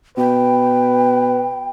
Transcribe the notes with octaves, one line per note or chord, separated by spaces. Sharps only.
B2 B4 G5